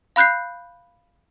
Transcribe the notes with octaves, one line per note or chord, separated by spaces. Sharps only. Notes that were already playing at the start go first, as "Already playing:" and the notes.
F5 B5 F#6 G6 C7